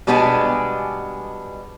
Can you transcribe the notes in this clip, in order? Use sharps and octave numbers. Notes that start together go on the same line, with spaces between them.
B2 G3 G#3 B3 D4 G#5